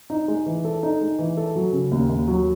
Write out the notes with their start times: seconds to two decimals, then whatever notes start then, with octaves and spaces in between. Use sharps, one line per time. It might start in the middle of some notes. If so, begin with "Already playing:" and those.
0.10 D#4
0.28 G#3
0.46 E3
0.65 A4
0.83 D#4
1.01 G#3
1.19 E3
1.37 A4
1.56 F#3
1.73 C#3
1.91 D#2
2.09 D#2
2.28 F#3